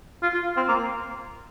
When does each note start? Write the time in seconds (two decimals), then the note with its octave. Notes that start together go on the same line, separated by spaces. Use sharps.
0.23 F4
0.34 F4
0.57 C4
0.69 A#3